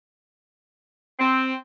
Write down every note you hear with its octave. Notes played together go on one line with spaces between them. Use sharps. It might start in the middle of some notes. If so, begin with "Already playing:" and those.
C4